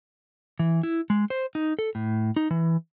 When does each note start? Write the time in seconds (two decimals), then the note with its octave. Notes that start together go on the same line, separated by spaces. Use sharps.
0.59 E3
0.83 E4
1.10 G#3
1.30 C5
1.55 D#4
1.79 A4
1.95 A2
2.36 D#4
2.51 E3